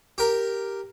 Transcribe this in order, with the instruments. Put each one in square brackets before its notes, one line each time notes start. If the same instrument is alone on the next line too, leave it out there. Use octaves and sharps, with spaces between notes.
[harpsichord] G4 A#4